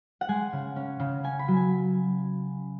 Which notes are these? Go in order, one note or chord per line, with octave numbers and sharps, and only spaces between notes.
F#5
G#3 G#5
C#3
C#4
C#3
C#4 G#5
B5
F#3
G#5